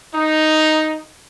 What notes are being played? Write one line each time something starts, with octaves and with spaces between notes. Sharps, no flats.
D#4